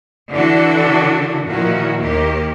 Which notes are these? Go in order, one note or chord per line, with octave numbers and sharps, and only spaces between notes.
D3 E3 D4 F#4 A4
A#2 D#3 F3 E4 F#4
D#2 D#3 A#3 G4